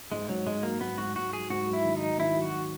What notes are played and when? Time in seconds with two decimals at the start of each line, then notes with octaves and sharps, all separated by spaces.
0.12 G#2 G#3
0.29 G#2 F#3
0.46 G#2 G#3
0.63 F#3 A#3
0.81 G#2 B3
0.98 G#2 F#4
1.16 G#2 F#4
1.33 F#3 G#4
1.50 G#2 F#4
1.67 F#3
1.73 E4
1.85 D#3
1.96 F#3 D#4
2.18 D#3 E4
2.37 F#3
2.42 F#4